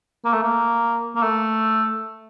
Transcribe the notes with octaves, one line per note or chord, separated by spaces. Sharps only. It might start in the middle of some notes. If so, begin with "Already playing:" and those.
A#3
A3
A#3
A#3
A3